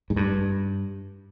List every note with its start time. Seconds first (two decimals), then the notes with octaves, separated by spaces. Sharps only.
0.10 G#2
0.16 G2